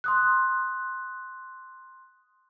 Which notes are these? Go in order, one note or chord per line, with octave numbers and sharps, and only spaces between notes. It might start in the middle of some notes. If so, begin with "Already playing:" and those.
C6 D#6 F#6